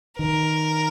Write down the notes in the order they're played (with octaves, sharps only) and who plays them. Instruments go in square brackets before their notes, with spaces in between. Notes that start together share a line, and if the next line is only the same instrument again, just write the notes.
[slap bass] D#3 [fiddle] A#4